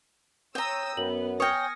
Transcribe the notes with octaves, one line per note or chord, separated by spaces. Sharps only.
C#5 G5 A#5 D#6 E6
F#2 B3 F#7
C#5 G5 G#5 D#6 F6 A#6 C#7